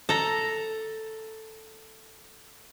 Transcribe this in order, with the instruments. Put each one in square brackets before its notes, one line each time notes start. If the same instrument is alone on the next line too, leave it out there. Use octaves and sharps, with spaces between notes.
[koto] A4 A#5